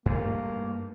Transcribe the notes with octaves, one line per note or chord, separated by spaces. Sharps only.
G2 A3 A#3